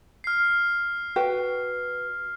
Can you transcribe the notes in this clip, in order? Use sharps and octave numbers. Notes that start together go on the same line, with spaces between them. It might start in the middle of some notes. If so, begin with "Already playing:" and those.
F6 C7
F#4 B4 G5